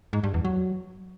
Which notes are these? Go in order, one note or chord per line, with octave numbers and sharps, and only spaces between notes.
G#2
G2
E2
F#3